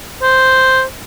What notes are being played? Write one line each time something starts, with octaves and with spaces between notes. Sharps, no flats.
C5